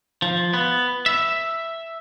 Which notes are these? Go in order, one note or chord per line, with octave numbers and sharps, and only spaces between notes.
F3
B3
E5